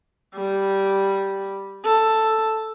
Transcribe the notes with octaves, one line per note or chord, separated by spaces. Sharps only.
G3
A4